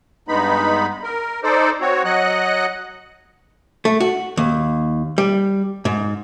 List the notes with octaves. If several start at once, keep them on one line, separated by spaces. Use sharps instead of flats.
G2 G#3 B3 D#4 B5
A#4
D#4 A4 C5 D5
C4 F#4 C#5
F#3 D#5 F#5 F#6
A3
F#4
D#2
G3
G#2